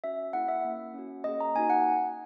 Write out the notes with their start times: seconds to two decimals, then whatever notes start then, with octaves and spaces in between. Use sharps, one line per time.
0.04 C#4 F#4 E5
0.33 A#3 E4 G#4 F#5
0.48 E5
0.65 A#3 C#4 E4
0.94 C#4 F#4
1.24 A#3 C#4 G#4 D#5
1.40 A#5
1.55 A#3 D#4 F#4 G#5
1.70 F#5